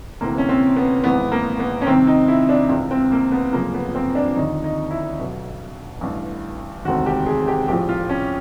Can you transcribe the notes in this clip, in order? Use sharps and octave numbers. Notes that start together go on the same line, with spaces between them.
D2 C3 E3 A#3
C#4
C4
B3
G#1 G#2 E3 B3
A#3
B3
C#4
C2 C3 D#3 C4
D#4
E4
D4
C#2 C3 E3
C4
A#3
B3
G1 F#2 C#3 F3 A#3
B3
C4
D4
D#2 D3 F3 D#4
D#4
E4
B1 B2
A1 G2 E3
E1 D2 C3 D#3 F#4
G4
G#4
G4
A#1 A2 F3 G4
F4
C#4